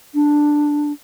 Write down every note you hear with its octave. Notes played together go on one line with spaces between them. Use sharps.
D4